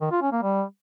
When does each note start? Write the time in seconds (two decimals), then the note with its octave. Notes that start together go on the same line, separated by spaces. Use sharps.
0.01 D#3
0.12 F4
0.22 C#4
0.32 A#3
0.43 G3